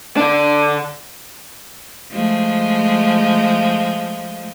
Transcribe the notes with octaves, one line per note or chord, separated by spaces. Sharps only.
D3 D4
F3 G#3 A3